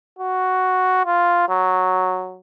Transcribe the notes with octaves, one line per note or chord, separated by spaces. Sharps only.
F#4
F4
F#3